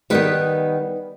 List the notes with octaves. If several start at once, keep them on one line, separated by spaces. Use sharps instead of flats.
D#3 G3 B3 B4